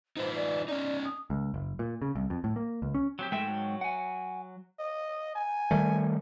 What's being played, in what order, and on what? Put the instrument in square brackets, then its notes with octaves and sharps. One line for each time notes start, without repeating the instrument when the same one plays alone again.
[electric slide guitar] D#4 F4 B4 [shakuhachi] C5
[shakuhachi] D5
[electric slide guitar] C#4 D#4 [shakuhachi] D5
[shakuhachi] D#6
[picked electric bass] C#2
F#1
A#2
C#3
C2
F2
A2
A#3
C#2
C#4
[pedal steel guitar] F#3 C4 G4
[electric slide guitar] G#2 G5 [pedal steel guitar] G#3 A3 E5
[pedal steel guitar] F#3
[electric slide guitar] F#5 G#5
[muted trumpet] D#5
G#5
[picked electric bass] D#3 G3 A3